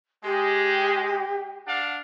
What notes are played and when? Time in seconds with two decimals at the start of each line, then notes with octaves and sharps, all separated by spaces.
0.24 G#3 G4
1.66 D4 F5 F#5